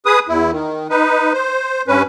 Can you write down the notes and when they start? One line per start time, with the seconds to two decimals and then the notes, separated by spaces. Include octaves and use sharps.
0.06 G#4 B4 D#6
0.29 E2 E4
0.52 D#3
0.90 D#4 B4
1.33 C5
1.88 G2 C#4 B4